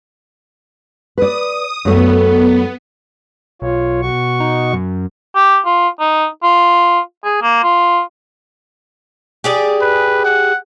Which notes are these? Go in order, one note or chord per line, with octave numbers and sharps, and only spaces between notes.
B4 D5 D#6
F#2 A3 B3
B1 F4 C#5
B2 F#4 C#6
D#4
F#2
G4
F4
D#4
F4
G#4
A#3
F4
G4 G#4 D5
B4
F#5